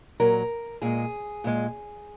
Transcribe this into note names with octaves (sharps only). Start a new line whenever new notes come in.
A#2 F#3 A#4
A#2 G#3 G#4
A#2 G#3